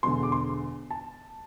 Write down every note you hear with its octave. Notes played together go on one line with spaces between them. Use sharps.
E1 E2 D3 C6
D6
C6
A5